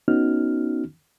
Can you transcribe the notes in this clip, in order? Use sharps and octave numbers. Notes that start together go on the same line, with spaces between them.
B3 C#4 D#4 F#4 F6